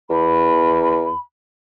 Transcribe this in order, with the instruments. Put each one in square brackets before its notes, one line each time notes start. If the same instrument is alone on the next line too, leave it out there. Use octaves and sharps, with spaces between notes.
[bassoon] E2 [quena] B5